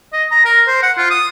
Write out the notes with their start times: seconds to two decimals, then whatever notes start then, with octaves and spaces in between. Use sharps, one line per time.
0.13 D#5
0.31 A#5
0.45 A#4
0.67 C5
0.83 F#5
0.98 F4
1.10 D#6